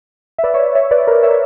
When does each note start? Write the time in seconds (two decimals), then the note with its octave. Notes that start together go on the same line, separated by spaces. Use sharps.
0.38 E5
0.43 B4 D5
0.54 C#5 E5
0.75 C#5 E5
0.91 B4 D5
1.07 A#4 C#5
1.23 C#5 E5